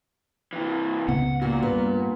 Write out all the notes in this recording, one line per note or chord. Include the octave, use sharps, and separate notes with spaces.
C3 E3
C#2 C#3 B3 F#5
A#2 F#4
G2 B3